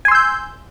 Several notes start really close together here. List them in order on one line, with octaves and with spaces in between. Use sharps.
G#5 C6 E6 G6